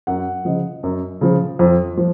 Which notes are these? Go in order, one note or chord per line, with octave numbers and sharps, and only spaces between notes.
F#2 F#5
C#3 F3 D#5
F#2
C#3 F3
F2
F3